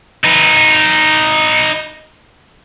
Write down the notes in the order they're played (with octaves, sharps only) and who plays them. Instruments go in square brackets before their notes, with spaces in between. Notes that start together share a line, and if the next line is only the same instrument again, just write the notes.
[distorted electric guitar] D#4 B4